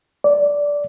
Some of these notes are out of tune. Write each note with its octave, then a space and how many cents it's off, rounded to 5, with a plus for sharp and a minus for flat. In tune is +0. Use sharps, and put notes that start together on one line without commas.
D5 -10